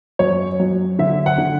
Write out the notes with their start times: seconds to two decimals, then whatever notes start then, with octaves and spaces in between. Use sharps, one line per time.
0.19 F#2 C#5
0.60 F#3
0.99 D3 E5
1.26 F#5
1.38 D3